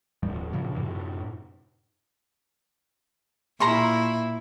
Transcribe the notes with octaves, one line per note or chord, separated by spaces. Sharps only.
D#1 A2 F3 G3
G2 A#2 C#3 F3
F#2 A2 C3
A#2 E4 A#5 C6 C#6